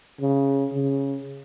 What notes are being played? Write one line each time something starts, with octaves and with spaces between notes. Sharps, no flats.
C#3
C#3